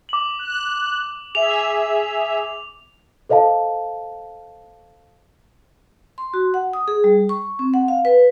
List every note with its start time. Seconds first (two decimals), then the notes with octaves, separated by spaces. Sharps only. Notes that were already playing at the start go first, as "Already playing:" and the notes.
0.09 D6 F#7
0.39 F#6
1.35 G#4 E5 F7
3.29 A4 C5 D#5 F5 A5
6.18 C6
6.34 F#4
6.54 F#5
6.73 D#6
6.88 G#4
7.04 G3
7.29 C#6
7.59 C4
7.74 F#5
7.88 F5
8.05 B4